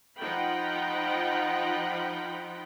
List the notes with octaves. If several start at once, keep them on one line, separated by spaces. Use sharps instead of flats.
F3 D#4 F4 F#5 G5 B5